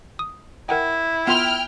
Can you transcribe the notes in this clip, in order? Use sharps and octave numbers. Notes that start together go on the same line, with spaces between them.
D#6
E4 A#4 F#5 G5
B3 F4 G5 C6 F6